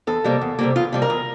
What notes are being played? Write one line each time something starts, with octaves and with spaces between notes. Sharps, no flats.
E2 A4
C3 G3 A#3
E2
C3 G3 A#3
E2 F4
C3 G3 A#3 A4
A#4
E2